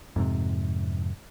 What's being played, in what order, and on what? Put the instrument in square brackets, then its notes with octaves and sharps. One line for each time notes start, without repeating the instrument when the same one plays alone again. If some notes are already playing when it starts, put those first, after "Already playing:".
[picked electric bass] F2 G#2 C3